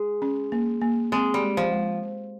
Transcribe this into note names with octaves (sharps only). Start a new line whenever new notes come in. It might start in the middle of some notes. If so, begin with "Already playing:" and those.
Already playing: G#3
C#4
A#3
A#3
G#3 C4
G3
G#3
F3
G#3